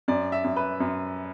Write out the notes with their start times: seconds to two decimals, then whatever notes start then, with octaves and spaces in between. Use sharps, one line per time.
0.08 F#2 D5
0.32 E5
0.44 F#2
0.56 B4
0.80 F#2